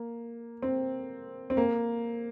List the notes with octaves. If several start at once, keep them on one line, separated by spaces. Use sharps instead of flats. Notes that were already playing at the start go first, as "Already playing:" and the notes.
Already playing: A#3
C4
C4
A#3